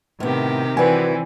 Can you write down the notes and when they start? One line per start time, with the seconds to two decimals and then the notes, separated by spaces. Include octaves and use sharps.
0.20 A2 C3 D#3 B3 G4
0.77 E3 C4 F#4 B4 D5 G#5